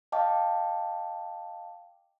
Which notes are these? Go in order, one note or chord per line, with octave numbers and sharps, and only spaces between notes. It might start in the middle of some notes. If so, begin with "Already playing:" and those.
D#5 F5 G5 A5 D6